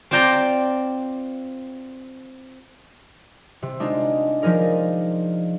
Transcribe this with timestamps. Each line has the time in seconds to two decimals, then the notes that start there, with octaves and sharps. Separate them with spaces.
0.11 C4 F4 D5 G5 A#5
3.62 C3
3.80 G#3 D4 D#4 F4
4.42 F3 D#4 G#4 A#4 D5